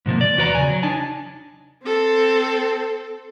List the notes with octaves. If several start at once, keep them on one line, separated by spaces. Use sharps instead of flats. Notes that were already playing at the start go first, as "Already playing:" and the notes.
G#2 C3 F3 A#3
D5
E2 F#4 B4 D5 A#5
C#3 G#5
F#3
D4 D#4 G#5 A5
C4 A4